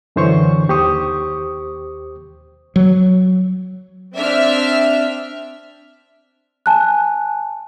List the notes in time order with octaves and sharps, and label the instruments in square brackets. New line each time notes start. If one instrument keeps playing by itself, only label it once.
[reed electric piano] F#2 D3 E3 C5 C#5 C#6
D#2 G4 C5 C#6 D#6
[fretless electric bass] F#3
[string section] C4 D4 E5 F6
[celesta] G#5 A5 F#6